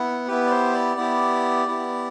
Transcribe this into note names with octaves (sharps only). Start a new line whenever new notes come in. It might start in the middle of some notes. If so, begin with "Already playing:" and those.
Already playing: B3 E4 F#5
B3 E4 G4 B4
D5
C5
D5
B3 E4 G4
B3 E4 G4